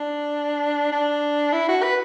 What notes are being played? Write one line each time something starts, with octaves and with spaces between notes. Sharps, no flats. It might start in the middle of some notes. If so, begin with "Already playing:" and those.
Already playing: D4
D4
E4
F#4
B4